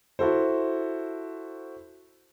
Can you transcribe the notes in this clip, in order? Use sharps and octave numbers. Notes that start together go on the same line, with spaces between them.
E4 F#4 A4 C5